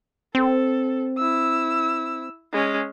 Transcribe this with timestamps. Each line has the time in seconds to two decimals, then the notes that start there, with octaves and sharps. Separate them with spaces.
0.35 C4 A4
1.18 E4 E6
2.53 G#3 C#4